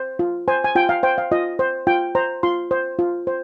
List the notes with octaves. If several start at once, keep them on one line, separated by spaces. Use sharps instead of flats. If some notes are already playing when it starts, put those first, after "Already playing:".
Already playing: C5
F4
C5 G#5
G#5
F4 G5
F5
C5 G5
F5
F4 D#5
C5
F4 G5
C5 A#5
F4 C6
C5
F4
C5